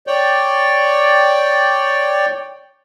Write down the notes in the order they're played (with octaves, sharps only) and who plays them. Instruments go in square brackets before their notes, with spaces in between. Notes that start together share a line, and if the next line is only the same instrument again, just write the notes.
[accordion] C#5 D5 G5